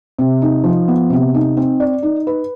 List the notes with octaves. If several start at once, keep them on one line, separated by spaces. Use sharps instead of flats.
C3
D#4
F3
B3
C3
D#4
C4
D5
D#4
B4